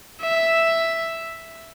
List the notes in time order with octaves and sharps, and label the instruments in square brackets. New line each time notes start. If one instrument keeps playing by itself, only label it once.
[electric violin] E5